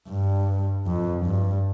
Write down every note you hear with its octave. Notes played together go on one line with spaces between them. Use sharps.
G2
F2
G2